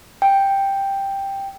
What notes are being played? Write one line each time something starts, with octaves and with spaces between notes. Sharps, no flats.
G5